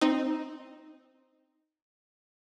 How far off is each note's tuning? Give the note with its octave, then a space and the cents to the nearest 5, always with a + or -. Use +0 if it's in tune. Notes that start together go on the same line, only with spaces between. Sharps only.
C4 +0 D#4 +0